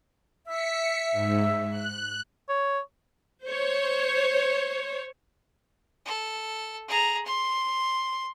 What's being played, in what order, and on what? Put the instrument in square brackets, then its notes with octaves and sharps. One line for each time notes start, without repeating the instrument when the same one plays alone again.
[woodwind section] E5 [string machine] B6 C#7
[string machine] G#2
F#6
[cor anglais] C#5
[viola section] C5 C#5
[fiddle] A4
G#4 A#5
C6